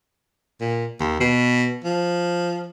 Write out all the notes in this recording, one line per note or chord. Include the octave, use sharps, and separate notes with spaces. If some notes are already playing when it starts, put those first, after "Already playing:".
A#2
D#2
B2
F3